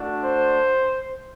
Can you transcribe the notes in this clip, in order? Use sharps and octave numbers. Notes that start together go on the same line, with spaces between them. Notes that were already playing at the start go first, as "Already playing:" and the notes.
Already playing: A3 D4 F#4
C5